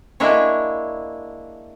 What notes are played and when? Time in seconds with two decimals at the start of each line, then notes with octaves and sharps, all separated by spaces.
0.20 G#3 A#3 D4 E4 C#5